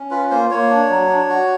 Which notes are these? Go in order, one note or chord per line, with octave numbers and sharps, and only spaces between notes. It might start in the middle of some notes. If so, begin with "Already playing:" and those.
Already playing: C#4
F4 B4
A#3 C5
A#3 C#5
D4
F#3
D4
F#4